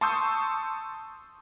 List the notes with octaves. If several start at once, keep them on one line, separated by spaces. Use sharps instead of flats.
A5 C6 C#6 D#6 E6 G6